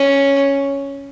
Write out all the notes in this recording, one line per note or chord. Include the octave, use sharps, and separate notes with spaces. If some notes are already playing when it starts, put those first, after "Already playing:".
Already playing: C#4